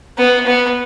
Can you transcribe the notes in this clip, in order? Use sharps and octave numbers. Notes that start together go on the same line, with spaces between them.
B3
B3